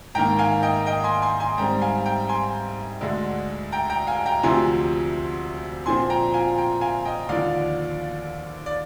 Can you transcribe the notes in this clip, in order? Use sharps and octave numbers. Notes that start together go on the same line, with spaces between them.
G#2 D#3 A#3 G5 A#5
F5 G#5
D#5 G5
D#5 G5
G#5 C6
G#5 C6
G#5 C6
G#2 G3 C4 G5 A#5
F5 G#5
G5 A#5
G#5 C6
D2 D3 G#3
G5 A#5
G5 A#5
F5 G#5
G5 A#5
D2 C3 F3 G#5 C6
A#2 F3 C4 G#5 C6
G5 A#5
F5 G#5
G5 A#5
F5 G#5
D#5 G5
D#2 D3 F3 D5 F5
D5